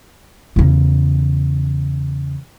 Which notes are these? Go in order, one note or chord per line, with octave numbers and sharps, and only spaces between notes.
E2 C#3